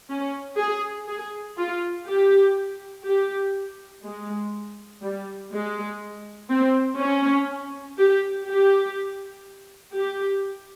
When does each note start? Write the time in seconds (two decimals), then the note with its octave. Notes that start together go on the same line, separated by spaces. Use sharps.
0.10 C#4
0.59 G#4
1.08 G#4
1.57 F4
2.07 G4
3.05 G4
4.04 G#3
5.03 G3
5.52 G#3
6.50 C4
6.99 C#4
7.98 G4
8.47 G4
9.95 G4